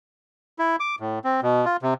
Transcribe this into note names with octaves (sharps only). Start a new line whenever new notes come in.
E4
D6
A2
C4
B2
F4
C3